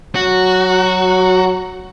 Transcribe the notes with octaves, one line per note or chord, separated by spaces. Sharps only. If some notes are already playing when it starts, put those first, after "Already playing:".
F#3 F#4